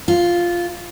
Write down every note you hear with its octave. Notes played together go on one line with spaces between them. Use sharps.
F4